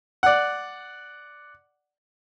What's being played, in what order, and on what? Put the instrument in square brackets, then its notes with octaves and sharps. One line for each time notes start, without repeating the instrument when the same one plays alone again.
[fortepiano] D5 F#5